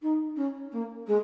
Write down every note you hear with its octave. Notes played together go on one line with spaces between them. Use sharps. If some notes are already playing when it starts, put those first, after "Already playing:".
D#4
C#4
A#3
G#3